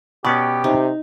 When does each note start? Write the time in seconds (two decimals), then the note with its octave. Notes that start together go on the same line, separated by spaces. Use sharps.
0.25 B2 B3 C#4 G4 D5
0.64 C3 D#4